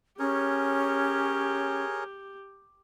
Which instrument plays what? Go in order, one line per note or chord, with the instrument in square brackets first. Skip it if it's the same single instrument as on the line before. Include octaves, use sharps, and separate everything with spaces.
[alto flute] C#4 [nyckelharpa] G4 [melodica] G#4 A#4 C#5